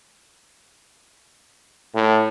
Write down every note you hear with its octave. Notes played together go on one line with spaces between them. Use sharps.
A2